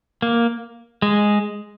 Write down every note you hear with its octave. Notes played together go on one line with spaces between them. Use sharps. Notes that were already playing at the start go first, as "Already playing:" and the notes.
A#3
G#3